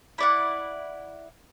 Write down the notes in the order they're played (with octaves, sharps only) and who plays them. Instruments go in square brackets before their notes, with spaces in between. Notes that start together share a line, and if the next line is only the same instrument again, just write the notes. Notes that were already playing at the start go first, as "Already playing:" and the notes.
[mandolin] E4 D5 F#5